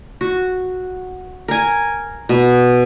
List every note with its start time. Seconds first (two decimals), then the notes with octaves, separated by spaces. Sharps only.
0.21 F#4
1.48 A#4 G#5
2.29 B2